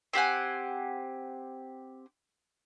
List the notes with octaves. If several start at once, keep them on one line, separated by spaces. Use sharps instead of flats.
C4 G4 F#5 G#5